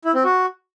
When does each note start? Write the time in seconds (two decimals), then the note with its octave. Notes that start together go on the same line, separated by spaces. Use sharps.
0.05 E4
0.15 C4
0.24 F#4